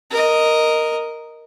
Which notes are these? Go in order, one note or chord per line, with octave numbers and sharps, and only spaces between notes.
A#4 D#5